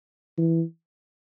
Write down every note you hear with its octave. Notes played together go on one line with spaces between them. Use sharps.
E3